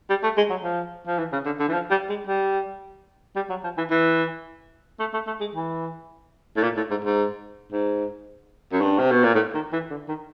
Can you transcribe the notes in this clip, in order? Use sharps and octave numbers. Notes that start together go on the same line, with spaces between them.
G3
A3
G#3
F#3
F3
F3
E3
C#3
D3
D3
E3
F3
G3
G#3
G3
G3
F#3
F3
E3
E3
A3
A3
A3
G#3
E3
A2
A#2
A2
G#2
G#2
G#2
F#2
G2
C3
B2
A#2
A2
D#3
E3
D3
D#3